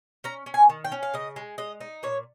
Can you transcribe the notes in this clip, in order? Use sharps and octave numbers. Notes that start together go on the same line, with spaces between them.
C#4 A#5
C#4
G#5
D#3
G5
C#4
F5
C#3 D#5
G#3
G#3 D#5
D#4
A#2 C#5